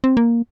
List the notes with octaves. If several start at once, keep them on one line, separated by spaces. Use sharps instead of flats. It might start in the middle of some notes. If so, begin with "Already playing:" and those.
C4
A#3